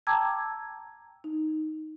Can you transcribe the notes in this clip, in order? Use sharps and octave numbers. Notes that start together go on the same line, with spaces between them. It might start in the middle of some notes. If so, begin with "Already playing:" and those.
G5 A5 A#5 D6 E6 G#6
D#4